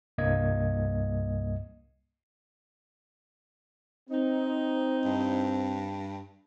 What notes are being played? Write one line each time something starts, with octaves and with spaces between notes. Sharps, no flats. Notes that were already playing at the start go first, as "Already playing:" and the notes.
C2 G2 A#3 D#5 G#6
C4 D#4
G2